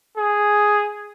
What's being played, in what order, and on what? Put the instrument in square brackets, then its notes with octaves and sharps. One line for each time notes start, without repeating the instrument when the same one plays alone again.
[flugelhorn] G#4